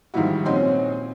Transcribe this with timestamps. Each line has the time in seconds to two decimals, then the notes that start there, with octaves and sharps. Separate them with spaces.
0.14 G#2 D#3 F3 G3 E4 F#4
0.46 A#2 C4 C#4 D#5 F#5 C6